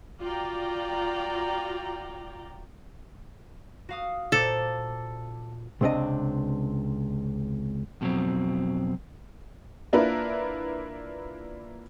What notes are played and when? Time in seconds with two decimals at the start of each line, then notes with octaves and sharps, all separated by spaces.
0.22 F4 F#4 D5 G5 A#5
3.89 F#4 F5 D#6
4.32 A#2 A4 C5 D6
5.81 C#2 C3 C4 D4 D#5
8.01 F2 B2 F3 F#3 C4
9.93 A#3 D4 E4 F4 A#4 B4